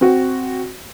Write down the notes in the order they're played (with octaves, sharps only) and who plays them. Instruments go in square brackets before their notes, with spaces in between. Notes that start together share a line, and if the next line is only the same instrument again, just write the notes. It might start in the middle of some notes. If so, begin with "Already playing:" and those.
[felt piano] C4 F#4